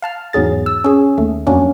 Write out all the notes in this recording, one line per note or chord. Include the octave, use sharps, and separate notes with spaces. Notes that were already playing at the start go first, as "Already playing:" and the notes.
F5 A5 F6
E2 G#2 F#3 G#4 A6
E6
C#4 G#4
D#2 A3
F2 F#3 A#3 C#4 D4